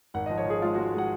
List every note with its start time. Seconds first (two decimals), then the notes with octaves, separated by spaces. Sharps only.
0.14 G#1 F#5
0.26 D#5
0.29 F3
0.38 C#5
0.46 F3 G#4
0.62 G#3 F4
0.74 G#3 F#4
0.94 G#3 F#5